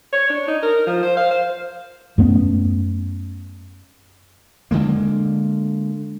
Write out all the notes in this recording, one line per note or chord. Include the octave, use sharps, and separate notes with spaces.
C#5
D4
D#4
A#4
F3
C5
F5
C5
F#2 A3 B3 C#4
D3 E3 G#3 A#3